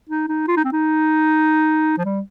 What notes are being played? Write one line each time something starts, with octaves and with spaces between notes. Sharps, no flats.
D#4
D#4
F4
D#4
C4
D#4
F3
G3